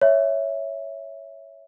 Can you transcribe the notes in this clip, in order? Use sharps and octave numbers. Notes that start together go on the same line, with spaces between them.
C#5 E5